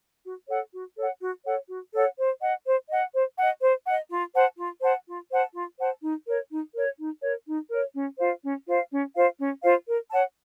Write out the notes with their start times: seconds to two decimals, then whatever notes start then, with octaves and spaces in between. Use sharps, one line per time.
0.24 F#4
0.48 A4 C#5 F#5
0.73 F#4
0.97 A4 C#5 F#5
1.21 F#4
1.45 A4 C#5 F#5
1.69 F#4
1.93 A4 C#5 F#5
2.18 C5
2.41 D#5 F#5
2.66 C5
2.89 D#5 F#5
3.13 C5
3.38 D#5 F#5
3.62 C5
3.86 D#5 F#5
4.10 F4
4.34 C5 F#5 A5
4.58 F4
4.81 C5 F#5 A5
5.07 F4
5.31 C5 F#5 A5
5.54 F4
5.79 C5 F#5 A5
6.02 D#4
6.27 A#4 C#5
6.50 D#4
6.74 A#4 C#5
6.99 D#4
7.22 A#4 C#5
7.46 D#4
7.70 A#4 C#5
7.95 C#4
8.20 F4 C5 F5
8.43 C#4
8.66 F4 C5 F5
8.91 C#4
9.15 F4 C5 F5
9.39 C#4
9.63 F4 C5 F5
9.87 A#4
10.11 C#5 F#5 A5